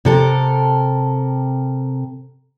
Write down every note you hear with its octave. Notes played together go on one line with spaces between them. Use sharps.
C3 A4 A#4